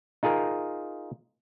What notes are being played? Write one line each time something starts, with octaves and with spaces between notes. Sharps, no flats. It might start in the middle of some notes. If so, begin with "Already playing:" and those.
D#4 F4 G#4 A#4